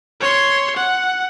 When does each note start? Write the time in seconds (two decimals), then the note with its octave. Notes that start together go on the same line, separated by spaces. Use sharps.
0.21 C#5 C6
0.76 F#5